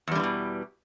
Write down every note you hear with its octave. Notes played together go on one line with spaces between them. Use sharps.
E2 B2 D3 E3 G3